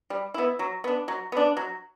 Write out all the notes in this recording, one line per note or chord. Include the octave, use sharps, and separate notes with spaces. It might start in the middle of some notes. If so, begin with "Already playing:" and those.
G3
B3 E4
F#3
B3 D4
F#3
B3 D4
F#3